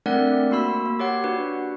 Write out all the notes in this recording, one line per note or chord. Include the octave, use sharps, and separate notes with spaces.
A3 C4 D4 A#4 D5 F#5
A#3 F#4 B5 E6
A#3
G4 C#5 F#5
D4 F#4 B4